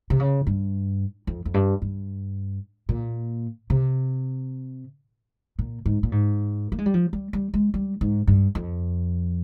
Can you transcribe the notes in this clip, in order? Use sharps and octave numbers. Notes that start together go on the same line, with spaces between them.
C3
C#3
G2
F2
F2
G2
G2
A#2
C3
A#2
G#2
A#2
G#2
A#3
G#3
G3
F3
G3
G3
G#3
G3
G#2
G2
F2